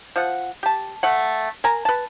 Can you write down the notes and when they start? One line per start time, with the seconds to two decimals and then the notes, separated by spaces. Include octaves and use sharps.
0.16 F3 F#5
0.63 G4 A5
1.03 A3 F#5
1.64 A#4 G#5 A#5
1.85 B4 A5